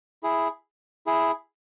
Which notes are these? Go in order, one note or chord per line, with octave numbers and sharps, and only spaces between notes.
E4 G#4
E4 G#4